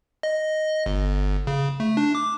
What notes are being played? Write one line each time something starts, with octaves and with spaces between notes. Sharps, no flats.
D#5
G1
C#3
A3
D4
D6